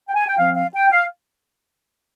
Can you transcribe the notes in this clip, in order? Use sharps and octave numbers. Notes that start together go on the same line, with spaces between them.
G5
G#5
G5
F3 C4 F5
F5
G5
F5